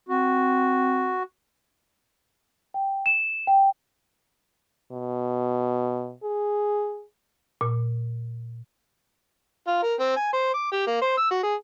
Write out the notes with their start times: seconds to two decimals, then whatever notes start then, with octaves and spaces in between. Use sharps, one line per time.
0.09 C4 F#4
2.74 G5
3.06 E7
3.47 G5
4.92 B2
6.23 G#4
7.61 A#2
9.67 F4
9.83 A#4
9.99 C4
10.16 G#5
10.33 C5
10.54 D6
10.72 G4
10.87 A#3
11.02 C5
11.18 E6
11.31 F#4
11.43 G#4